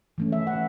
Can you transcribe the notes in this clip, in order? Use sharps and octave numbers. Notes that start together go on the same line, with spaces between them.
E3 A3 C#4
E5
F#5